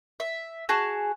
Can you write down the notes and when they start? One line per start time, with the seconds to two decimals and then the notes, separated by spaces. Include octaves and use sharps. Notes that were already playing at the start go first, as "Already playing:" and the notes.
0.20 E5
0.69 F#4 G#4 A5